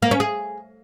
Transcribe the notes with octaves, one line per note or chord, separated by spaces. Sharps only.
A#3
C#4
G#4